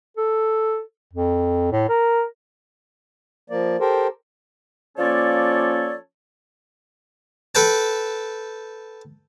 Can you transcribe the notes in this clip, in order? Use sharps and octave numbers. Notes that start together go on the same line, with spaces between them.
A4
F2
A2
A#4
F3 A#3 D5
G4 A4 A#4 C5
F3 A#3 C#4 A4 C#5 D5
A4 B4 G5 A5